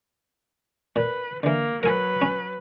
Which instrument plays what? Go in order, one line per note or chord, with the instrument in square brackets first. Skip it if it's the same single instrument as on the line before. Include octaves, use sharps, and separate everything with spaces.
[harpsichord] A#2 [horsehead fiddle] B4
[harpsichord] D3 E3 [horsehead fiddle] A#3
[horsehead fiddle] F#3 B4 [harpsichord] A#4 G#5
[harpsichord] C#4